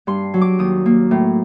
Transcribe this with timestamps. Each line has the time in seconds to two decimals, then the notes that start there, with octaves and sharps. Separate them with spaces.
0.07 G2 C6
0.34 F#3
0.41 D6
0.59 D#2 D#6
0.86 A#3
1.11 A2